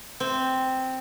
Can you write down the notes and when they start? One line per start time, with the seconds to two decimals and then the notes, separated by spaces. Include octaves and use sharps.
0.20 C4